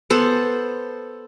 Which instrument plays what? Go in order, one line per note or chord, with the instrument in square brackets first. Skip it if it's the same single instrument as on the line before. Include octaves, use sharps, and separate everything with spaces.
[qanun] B3 A4 C5